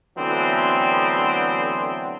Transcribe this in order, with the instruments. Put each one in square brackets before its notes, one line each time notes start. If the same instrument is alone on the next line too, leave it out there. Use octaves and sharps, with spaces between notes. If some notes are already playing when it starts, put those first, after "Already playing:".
[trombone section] D3 E3 F#3 A3 B3 C4